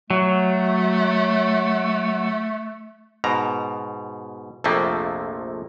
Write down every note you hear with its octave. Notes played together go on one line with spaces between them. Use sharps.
F#3 A3
G#2 B2 A#5
A#1 F2 C3 F3 A3 A#3